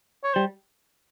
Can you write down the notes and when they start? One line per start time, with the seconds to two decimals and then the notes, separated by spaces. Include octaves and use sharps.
0.24 C#5
0.33 G3 C5